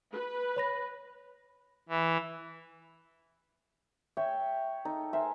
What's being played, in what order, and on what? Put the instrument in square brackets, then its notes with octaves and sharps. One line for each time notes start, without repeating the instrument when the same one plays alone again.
[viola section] B4
[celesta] C#5 B5 A#6
[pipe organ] E3
[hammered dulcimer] C#5 G5 [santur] E5
[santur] D#4 [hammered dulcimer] A4
[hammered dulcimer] A#4 C5 G#5 [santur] E5